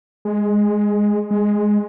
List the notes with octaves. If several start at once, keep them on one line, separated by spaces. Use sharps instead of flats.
G#3
G#3